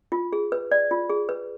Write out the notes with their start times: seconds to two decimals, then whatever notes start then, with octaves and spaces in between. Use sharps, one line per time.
0.12 F4
0.33 G#4
0.52 B4
0.71 D5
0.91 F4
1.10 G#4
1.29 B4